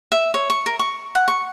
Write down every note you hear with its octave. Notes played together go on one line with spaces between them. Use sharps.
E5
C#5
C#6
A#4
C#6
F#5
C#6